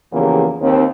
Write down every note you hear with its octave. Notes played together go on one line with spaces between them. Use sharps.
E2 C#3 E3 F3 A#3 G4
D#2 C4